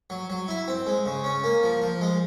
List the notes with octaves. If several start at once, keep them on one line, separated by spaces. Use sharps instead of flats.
F#3
F#3
E4
C4
G#3
C#3
C#4
A#3
F3
F3
G#3